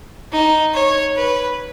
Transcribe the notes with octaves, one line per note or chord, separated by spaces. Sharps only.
D#4
C#5
B4